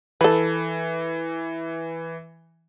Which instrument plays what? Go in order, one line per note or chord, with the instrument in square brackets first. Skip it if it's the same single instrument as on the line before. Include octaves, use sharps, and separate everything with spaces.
[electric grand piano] E3 [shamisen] A4 B4